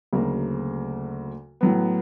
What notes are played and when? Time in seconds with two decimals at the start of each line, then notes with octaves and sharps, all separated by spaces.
0.13 D2 C#3 F#3 A#3
1.61 A2 F#3 B3